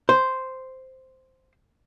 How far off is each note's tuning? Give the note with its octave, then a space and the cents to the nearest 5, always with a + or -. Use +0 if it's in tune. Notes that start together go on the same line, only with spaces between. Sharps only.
C5 -5